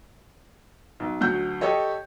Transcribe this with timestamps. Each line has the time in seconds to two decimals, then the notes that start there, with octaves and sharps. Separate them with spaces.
1.00 B1
1.21 D2 F#3 G6
1.61 G4 A4 C#5 D#5